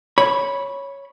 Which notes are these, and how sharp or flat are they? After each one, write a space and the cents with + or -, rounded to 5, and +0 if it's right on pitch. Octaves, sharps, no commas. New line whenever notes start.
C#5 +0 B5 -10